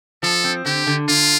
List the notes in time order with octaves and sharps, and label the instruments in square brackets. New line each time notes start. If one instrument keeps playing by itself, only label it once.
[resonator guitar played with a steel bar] F3 [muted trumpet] A4
[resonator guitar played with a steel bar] C4
[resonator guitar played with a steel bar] D3 [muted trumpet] G4
[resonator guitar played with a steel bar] D3
[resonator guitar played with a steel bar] D3 [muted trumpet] F4